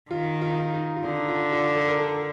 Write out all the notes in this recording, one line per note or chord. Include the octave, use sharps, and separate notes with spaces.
D#3 F4
F4
D#4
F4
D#4
F4
D3 D#4
F4
F4
A4
A#4
A4